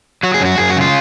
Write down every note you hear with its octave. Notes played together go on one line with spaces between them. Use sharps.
F#3 F#4
G#4
F#2 F#4
F#2 G#4
F#4
C#3 F4